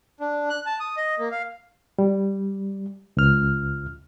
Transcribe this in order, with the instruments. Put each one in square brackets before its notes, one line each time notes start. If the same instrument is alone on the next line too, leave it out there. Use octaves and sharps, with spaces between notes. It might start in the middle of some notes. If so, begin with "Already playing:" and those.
[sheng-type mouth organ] D4
F#6
A5
D#6
D#5
A#3
F5
[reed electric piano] G3
C#2 F6